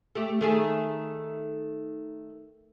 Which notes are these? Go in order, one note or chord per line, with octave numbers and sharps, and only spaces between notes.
A3 G4
D#3 A3 G#4